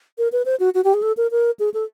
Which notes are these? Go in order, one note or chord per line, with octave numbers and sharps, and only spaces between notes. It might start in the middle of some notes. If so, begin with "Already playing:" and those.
A#4
B4
C5
F#4
F#4
G4
G#4
A4
A#4
A#4
G#4
A4